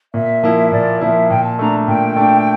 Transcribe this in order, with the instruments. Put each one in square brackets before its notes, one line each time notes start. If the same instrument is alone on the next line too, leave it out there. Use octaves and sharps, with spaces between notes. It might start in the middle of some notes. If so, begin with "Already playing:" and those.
[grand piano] A#2 [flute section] E5
[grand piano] F3 A#3 E4
[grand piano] A#2 [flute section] D5
[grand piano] F3 A#3 E4 [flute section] E5
[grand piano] A#2 [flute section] G5
[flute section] A5
[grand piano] A3 D4 [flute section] A#5
[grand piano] A#2 [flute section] G5
[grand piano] A3 D4